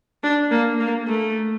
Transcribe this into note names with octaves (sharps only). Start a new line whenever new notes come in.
D4
A#3
A#3
A3